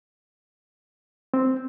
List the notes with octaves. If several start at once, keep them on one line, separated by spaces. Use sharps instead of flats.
C4